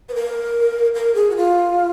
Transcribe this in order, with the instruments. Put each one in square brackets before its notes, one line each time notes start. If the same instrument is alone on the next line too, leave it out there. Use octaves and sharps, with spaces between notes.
[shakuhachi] B4
A#4
A#4
G#4
F#4
F4